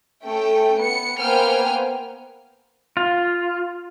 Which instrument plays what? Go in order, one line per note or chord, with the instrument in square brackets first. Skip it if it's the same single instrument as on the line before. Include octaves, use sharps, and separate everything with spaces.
[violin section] A3 C#4 G5
B3 C#7
A#3 B3 C5 G5 G#5 F6
[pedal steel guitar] F4